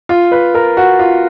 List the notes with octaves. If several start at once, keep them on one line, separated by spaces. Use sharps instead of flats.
F4
B4
A#4
F#4
F4